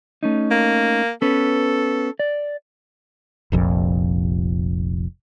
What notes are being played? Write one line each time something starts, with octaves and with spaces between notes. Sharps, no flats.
A3 C#4 D#4
A#3
B3 C#4 A4 B4
D5
F1 A#1 F2